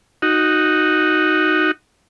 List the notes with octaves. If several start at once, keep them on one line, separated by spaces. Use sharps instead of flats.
D#4 F#4